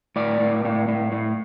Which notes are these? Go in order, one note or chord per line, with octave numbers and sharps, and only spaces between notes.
A2 D5
A2
A2
A2
A2